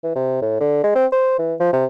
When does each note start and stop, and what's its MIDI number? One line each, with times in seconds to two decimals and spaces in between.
0.03 0.13 52
0.15 0.40 48
0.41 0.57 45
0.60 0.83 50
0.84 0.94 56
0.95 1.06 60
1.12 1.37 72
1.39 1.54 52
1.60 1.69 53
1.73 1.85 48